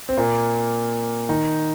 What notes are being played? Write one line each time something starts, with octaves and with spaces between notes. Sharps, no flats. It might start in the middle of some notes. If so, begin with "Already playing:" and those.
C4
A#2 A#3
D#3 D#4